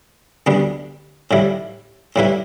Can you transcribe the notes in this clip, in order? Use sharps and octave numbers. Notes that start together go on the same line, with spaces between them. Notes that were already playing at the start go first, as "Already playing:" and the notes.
D2 D3 G3 B3
A2 G3 E4
A2 G3 E4 B4